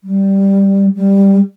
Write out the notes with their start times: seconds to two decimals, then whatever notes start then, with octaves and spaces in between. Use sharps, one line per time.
0.04 G3
0.96 G3